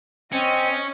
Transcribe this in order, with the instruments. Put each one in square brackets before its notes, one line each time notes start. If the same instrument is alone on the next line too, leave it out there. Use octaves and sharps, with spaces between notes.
[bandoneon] C4 [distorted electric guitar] C#4 [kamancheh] D#5